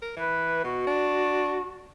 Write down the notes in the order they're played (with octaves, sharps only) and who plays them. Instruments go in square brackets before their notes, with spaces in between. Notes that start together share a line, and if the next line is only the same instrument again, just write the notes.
[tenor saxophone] A#4
[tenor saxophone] E3 [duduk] B4
[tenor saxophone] B2 [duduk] F#4
[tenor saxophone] D4